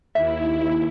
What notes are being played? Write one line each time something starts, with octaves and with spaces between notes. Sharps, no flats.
D#2 E4 E5